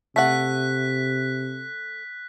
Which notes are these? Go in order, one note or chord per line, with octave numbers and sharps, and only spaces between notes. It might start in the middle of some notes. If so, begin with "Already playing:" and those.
C3 A3 F#5 F#6 B6